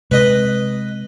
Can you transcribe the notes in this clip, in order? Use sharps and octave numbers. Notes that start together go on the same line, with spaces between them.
C3 G#3 B4 D#5